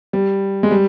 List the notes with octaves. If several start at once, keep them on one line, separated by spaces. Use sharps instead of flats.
G3
G#3
G3